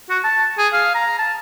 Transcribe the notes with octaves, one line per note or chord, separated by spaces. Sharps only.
F#4
A5
G#4
F5
A#5
A5